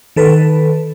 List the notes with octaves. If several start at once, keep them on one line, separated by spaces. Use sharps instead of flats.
D#3 A4 B4